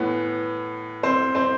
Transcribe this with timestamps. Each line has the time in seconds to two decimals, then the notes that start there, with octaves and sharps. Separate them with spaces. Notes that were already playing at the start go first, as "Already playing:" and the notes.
Already playing: A2 E3 B3
1.03 C4 C5
1.35 C4 C5